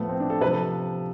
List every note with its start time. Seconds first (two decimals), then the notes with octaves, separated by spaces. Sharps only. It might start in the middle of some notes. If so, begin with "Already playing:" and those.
Already playing: A2 F3 A3 B3
0.09 C4
0.20 D4
0.30 A4
0.41 C3 B4
0.45 F3
0.52 A4